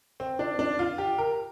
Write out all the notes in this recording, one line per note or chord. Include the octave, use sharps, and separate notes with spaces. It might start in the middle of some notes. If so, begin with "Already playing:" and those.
C4
D4
D4
F4
G4
A#4